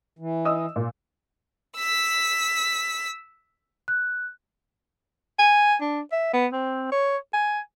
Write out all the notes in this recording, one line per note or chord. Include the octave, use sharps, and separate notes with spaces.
E3
D#5 D#6 E6
A#2
E6 B6
F#6
G#5
D4
E5
B3
C4
C#5
G#5